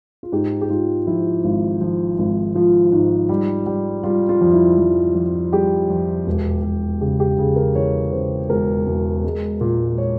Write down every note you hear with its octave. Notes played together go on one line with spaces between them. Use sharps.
F4
G#2 G4
G4
G#2 F4
F3 E4
G#1
F3
G#1
F3 F4
G#2
G3
G3
G3 F4
F4
F2
E4
F2
F2
G3 G4
F2
E1
E1
C#3 G4
G4
C#3 G#4
A#4
E2 C#5
C#3 C5
E1 A#4
E1
G#3
A#2
C#5